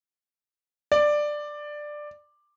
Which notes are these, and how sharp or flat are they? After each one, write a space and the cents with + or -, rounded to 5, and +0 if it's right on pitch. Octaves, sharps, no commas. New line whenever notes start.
D5 +10